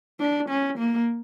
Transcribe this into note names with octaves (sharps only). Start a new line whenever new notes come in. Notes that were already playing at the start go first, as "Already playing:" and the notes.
D4
C#4
A#3